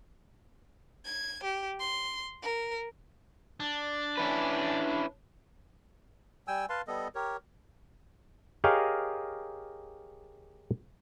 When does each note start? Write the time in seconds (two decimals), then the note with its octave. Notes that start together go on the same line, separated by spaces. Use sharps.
1.04 G#6
1.43 G4
1.79 C6
2.42 A#4
3.60 D4
4.18 C#4 E4 B4
6.48 G3 G5 G#5 E6
6.69 B4 F5 A5 C6
6.88 G3 B3 A4 D#5
7.15 G4 A#4 C#5
8.64 G4 G#4 A#4 C#5 D#5 F5